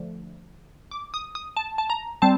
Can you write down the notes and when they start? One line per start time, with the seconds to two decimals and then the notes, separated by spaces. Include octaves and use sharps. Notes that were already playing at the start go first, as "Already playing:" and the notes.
Already playing: D3 F3 A3
0.91 D6
1.14 D#6
1.35 D#6
1.57 A5
1.78 A5
1.90 A#5
2.22 G3 C4 A5